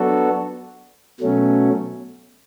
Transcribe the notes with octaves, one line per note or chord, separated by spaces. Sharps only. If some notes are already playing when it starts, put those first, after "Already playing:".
Already playing: F#3 B3 D4 F#4 A4
B2 F#3 A3 C#4